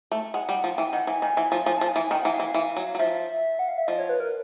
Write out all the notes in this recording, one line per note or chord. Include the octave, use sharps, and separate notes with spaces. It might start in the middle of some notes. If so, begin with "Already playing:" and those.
A3
G#3 F#5
G3
F3
E3 G5
D#3 F#5
E3 G#5
D#3 G#5
E3 G#5
F3 G#5
F3 G#5
A5
F3
G#5
E3
G#5
D#3 G5
F#5
E3
F5
E3
F5
E3
F#3
F#3
F3 E5
F#5
F5
E5
F3 D#5
C#5
B4
A#4